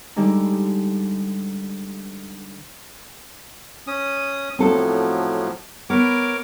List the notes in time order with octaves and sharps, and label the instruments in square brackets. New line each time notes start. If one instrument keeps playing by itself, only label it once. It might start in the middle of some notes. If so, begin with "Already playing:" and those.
[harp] D3 G3 G#3 D#4
[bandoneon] C#4 D#6
[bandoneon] A2 F3 F#3 [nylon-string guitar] C4 A4
[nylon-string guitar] B3 [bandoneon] A#4 C#5 D6